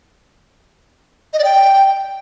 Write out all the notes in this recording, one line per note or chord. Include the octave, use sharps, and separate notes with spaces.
D#5
D5
G5